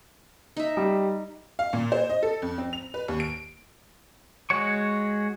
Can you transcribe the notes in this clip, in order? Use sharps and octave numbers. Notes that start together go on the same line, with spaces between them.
D#4 E5
G3
F5
A#2
C5
D#5
A4
F2
C4
F7
B4
D#2
D7
G#3 F#4 C#5 C#6